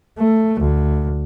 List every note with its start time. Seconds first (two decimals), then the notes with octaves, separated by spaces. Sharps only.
0.18 A3
0.60 D2